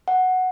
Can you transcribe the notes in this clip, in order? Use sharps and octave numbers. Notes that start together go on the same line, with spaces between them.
F#5